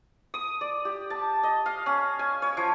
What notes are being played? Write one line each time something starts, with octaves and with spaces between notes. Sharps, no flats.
D#6
D5
G4
A5
D#5
F5
C#4
G#5
C#5
F3